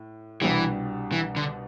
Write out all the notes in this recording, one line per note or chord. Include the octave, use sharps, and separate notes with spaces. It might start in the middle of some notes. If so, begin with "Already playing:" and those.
Already playing: A2
C2 B2 E3 G3 D4 G4
E3
D3